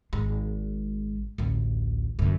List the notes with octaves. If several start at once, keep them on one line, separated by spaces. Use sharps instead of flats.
G#1 G#3
A1 D2
F#2 D3